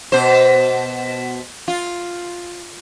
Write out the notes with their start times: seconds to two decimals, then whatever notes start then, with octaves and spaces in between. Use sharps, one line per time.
0.12 B2 C5
1.68 F4